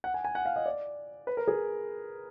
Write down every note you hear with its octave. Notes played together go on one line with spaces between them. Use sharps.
F#5
G#5
G#5
F#5
F5
D#5
D5
B4
A#4
G#4